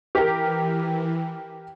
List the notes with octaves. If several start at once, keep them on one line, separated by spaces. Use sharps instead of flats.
E3 G4 A#4